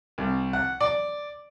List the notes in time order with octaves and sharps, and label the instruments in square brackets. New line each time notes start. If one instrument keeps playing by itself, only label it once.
[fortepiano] C2
F#5
D5